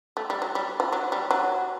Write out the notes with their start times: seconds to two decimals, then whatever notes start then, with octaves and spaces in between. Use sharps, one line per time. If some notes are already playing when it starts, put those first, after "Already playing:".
0.17 A3
0.30 G3
0.42 F#3
0.55 G3
0.80 F3
0.93 F#3
1.12 G3
1.31 F#3